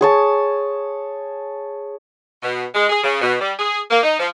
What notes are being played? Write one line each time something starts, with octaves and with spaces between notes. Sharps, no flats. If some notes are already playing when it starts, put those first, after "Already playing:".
G#4 C#5 A5
B2
G#3
G#4
C#3
B2
G3
G#4
A#3
D#4
F3